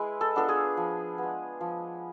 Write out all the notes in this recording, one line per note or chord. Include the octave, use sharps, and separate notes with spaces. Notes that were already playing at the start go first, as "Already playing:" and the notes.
Already playing: G#3 E4 B4
A4
B3 D4 F4 A4
G#4
F3
B3
G#3
F3